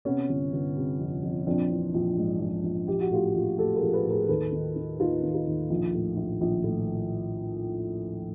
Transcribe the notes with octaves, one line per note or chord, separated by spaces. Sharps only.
C3 B3 C#4
G1
G1
C3
F2
F2
A#1 C4 D4
E3
A#1
G#2
A#1
A#1
A#1 G4
F#4
A2 F4 G4
A#1
A2 G4 A4
G#4 A#4
A#1
A4 B4
A2
G#4 A#4
D#2 A4 B4
D#3
D#3
D#2 D#4 F4
D#3
D#4 F4
D#2
A#1
A2
A#1
A#1
A2